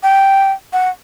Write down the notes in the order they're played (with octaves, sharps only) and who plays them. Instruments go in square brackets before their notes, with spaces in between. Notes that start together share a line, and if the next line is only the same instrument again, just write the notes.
[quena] G5
F#5